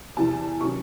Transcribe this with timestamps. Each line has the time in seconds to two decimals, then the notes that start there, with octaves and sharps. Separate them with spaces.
0.17 E2 C3 E3 A5
0.60 C3 D#3 F#3 C#4 C#6